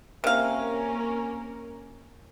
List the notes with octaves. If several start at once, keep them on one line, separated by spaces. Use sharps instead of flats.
C3 A#3 C#4 A#4 F5